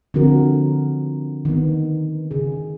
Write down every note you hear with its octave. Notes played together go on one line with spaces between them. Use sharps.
D3 F3 C4 D4 F#4 A#4
D#3 B3
C#3 G#4